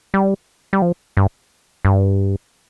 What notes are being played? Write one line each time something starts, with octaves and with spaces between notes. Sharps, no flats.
G3
G3
F3
G2
G2